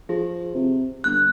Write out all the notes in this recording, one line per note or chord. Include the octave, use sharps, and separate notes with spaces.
F3 G#4
C3
G1 F#6